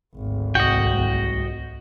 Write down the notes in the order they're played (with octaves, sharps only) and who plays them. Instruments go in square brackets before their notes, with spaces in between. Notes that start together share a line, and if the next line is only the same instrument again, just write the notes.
[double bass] G#1 D2
[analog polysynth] C2 [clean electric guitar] F#4 [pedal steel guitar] D#5 G5